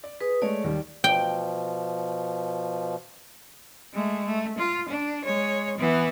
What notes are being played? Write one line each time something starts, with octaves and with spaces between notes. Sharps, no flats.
D5
G#4 B4 D#6
G#3 A3 C#5 D5
D#2 D#3 G3
B2 F3 G5
G#3 A3
A3
F4
D4
G#3 C#5
E3 B3